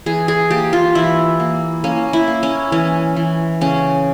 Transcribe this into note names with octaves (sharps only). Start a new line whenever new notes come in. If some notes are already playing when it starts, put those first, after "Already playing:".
E3 G#4
G#4
A#3 G4
F4
E3 E4
A#3
A#3 C#4
E4
A#3
C#4
E3 C#4
E3
C#3 C#4